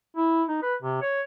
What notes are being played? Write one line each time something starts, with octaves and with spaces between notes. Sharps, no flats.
E4
D#4
B4
C3
C#5